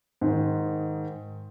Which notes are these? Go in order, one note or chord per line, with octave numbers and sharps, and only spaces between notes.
G#2 D#3